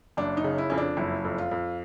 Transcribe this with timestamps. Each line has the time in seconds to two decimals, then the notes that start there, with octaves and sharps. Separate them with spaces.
0.17 F#1 D4
0.37 D#4
0.44 C#3
0.58 E4
0.70 F2 C#4
0.78 D4
0.97 F#1 E4
1.25 F2
1.38 F4
1.51 F2